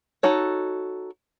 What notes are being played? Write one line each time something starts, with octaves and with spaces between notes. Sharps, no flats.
D#4 F#4 A4 C#5